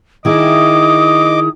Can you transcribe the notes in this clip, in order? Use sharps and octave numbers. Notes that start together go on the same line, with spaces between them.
D#3 E4 G#4 D#5 D6 D#6